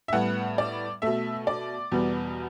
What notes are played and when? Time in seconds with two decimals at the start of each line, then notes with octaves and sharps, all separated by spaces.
0.08 E5
0.12 A2 G3 B3 F#5
0.58 D5
1.02 B2 A3 E5
1.47 D5
1.92 E2 B2 G3 B3